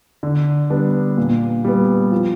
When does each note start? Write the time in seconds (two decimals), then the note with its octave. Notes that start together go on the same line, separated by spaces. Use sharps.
0.23 D3
0.70 G3 B3 D4
1.17 A#2
1.64 G3 B3
2.12 F3